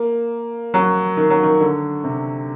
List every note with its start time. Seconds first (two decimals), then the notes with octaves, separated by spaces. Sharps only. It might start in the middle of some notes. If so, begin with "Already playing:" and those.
Already playing: A#3
0.74 F#3
1.17 D#3
1.30 F#3
1.43 D#3
1.61 D3
2.04 C3